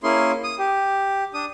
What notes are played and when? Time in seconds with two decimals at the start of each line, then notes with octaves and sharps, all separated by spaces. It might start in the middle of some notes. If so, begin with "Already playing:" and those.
0.03 A#3 C#4 E4 G#4 C6
0.44 D#6
0.59 G4
1.34 D4 D#6